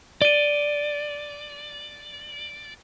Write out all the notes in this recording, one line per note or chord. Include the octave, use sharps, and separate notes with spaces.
D5 D#7 G7